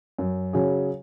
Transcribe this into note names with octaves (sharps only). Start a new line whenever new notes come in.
F#2
C#3 F#3 C#4 G#4